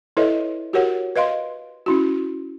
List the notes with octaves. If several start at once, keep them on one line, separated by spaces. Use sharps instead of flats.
E4 A4 B4 C#5 D#5 E5
F#4 G4 A#4 C#5 F#5
B4 D#5 F5 C6
C#4 E4 F#4